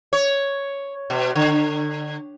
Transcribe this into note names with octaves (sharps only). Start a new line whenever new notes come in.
C#5
B2
D3